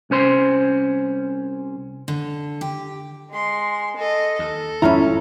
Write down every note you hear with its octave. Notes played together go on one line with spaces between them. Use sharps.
C2 C#4 C5 C6
D3
G4
G#3 C6
A4 D#5
D#2 A4
G#1 F2 G#3 C#4 E4 F4 A#5